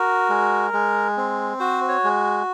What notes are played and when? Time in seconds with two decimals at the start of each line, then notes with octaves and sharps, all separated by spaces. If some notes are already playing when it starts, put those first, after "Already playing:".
Already playing: F#4 A#4
0.29 G#3
0.73 G#3
1.17 C4
1.60 F#4 C5
1.88 C#5
2.04 G#3